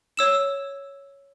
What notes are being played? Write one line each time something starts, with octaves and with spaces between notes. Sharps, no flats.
C#5 E6 E7